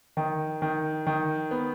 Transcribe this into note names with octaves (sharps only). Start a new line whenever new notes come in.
D#3
D#3
D#3
B3